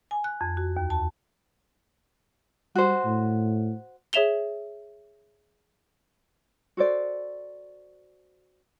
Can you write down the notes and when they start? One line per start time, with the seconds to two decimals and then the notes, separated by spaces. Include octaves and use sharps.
0.11 G#5
0.24 F#6
0.41 F2
0.57 F#4
0.77 D#2
0.90 A5
2.75 G3 F#4 C5
3.05 A2
4.13 G#4 C#5 E5 E7 F7 G7
6.77 F#4 A4 C5 D5